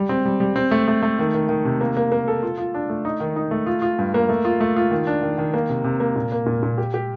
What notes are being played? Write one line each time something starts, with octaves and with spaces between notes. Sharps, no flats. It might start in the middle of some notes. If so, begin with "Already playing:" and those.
Already playing: G3
C4
G3
G3
C4
A3
A3
A3
D#3
D#3
D#3
C3
A#3
A#3
A#3
A4
F4
F4
D4
A3
D#4
D#3
D#4
A3
F4
F4
G2
A#3
A3
F4
A3
F4
D#3
D4
D#3
D#3
A#3
C3
C3
A#3
A#2
A#3
A#2
A#2
G4
G4